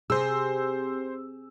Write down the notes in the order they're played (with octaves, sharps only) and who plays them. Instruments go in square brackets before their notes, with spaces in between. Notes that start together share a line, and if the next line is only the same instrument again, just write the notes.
[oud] C3 [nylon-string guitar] G#4 [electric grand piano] C5 E6